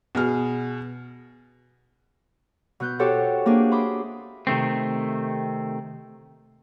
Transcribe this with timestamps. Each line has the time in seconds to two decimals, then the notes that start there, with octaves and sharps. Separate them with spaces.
0.15 B2 G#4 F6
2.80 B2 B3 F#6 G6
2.99 F#4 G4 A4 C5 C#5 F#5
3.46 A#3 C4 D4 G#4 C5
3.71 E5 B5 C6 D6 D#6
4.47 C3 D#3 A3 C4